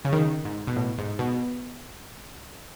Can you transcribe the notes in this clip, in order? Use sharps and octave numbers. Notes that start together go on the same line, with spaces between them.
C#3
D#3
G#2
B2
A2
G#2
B2